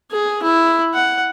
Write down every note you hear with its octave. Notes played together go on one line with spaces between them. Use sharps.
G#4
E4
F#5